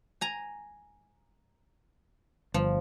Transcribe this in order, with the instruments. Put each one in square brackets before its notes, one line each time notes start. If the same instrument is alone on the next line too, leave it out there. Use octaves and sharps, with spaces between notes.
[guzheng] G#5 A#5
[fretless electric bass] G1 [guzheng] F3